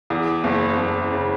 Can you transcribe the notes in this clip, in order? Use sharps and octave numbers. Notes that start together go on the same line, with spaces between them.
E2
F#1
F#1
C#3